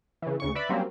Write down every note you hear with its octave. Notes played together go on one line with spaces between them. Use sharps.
C#3 E3
D2 C#3 C#6
B4 D5 E5 B5
F#3 G3 A#3 C4 C#4